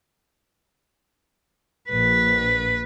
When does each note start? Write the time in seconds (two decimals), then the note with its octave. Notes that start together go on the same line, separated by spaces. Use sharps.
1.89 A#1 B4